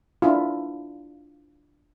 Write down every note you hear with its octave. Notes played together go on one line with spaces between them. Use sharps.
D4 E4 F4